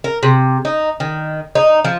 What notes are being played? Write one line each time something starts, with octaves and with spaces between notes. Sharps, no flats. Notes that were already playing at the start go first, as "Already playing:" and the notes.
A#4
C3
D#4
D#3
D#4
F3